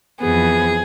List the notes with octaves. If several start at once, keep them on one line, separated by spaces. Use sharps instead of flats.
F2 E3 B3 G#4